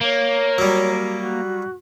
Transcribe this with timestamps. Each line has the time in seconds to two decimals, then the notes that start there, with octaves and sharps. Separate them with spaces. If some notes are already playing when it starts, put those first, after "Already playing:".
0.01 A#3 C#5
0.58 F#3 G3
1.17 F#4